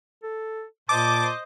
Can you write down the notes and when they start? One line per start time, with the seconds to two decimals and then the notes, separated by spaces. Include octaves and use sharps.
0.23 A4
0.89 A#2 C5 D#5 A5 D6